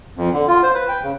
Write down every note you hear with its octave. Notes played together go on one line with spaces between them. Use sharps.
F2
D3
F4
C5
B4
G5
C#3